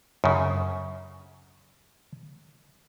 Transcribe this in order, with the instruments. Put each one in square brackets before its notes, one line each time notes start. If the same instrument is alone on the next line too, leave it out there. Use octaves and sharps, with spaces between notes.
[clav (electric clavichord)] F#2 C#3